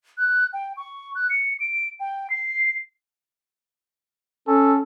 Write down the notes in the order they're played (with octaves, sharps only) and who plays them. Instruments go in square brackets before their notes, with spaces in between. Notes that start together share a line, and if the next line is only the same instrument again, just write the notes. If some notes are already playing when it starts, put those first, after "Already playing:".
[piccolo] F#6
G5
C#6
F#6
C#7
D7
G5
C7
[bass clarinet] C#4 [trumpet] A4